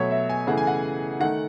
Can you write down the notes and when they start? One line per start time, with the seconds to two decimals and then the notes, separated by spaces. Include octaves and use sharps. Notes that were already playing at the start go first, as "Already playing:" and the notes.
Already playing: B2 F#3 A3 C#5 E5
0.11 E5
0.29 G#5
0.47 C#3 E3 A3 F#5
0.58 G#5
0.67 F#5
1.20 D#3 A3 F#5